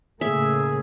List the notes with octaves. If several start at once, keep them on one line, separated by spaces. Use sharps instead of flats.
A2 C#3 A#3 G#4 E5